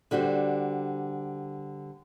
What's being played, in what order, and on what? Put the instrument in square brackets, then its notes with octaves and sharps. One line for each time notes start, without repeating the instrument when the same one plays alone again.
[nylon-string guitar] D3 G3 F#4 C5